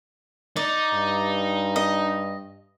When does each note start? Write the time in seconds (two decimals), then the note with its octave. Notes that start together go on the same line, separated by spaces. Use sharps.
0.56 D#4 D5
0.94 G2
1.76 D#5